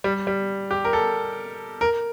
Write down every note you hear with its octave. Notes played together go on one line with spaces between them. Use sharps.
G3
G3
G4
A#4
A4
A#4